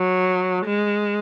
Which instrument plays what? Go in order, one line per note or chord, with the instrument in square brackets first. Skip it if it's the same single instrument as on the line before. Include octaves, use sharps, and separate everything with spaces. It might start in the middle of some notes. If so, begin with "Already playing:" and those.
Already playing: [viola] F#3
G#3